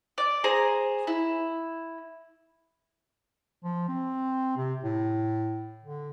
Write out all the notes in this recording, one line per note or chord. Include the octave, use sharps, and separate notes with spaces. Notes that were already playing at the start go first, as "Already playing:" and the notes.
D5
G#4 C5 A#5
E4
F3
C4
C3
A2
D3